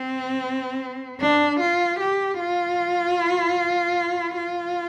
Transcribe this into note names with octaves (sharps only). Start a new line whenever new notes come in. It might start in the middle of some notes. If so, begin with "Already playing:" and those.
Already playing: C4
D4
F4
G4
F4
F4